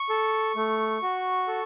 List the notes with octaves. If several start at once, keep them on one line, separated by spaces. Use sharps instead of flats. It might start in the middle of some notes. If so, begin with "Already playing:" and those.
Already playing: C#6
A4
A3
F#4
A4